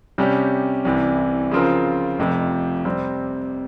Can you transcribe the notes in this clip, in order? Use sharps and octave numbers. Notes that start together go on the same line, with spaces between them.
C3 G3 C#4 G4
C2 C3 E3
C#3 F3 C4 F4 A#4
F1 F2 C3 F3
C3 G3 C4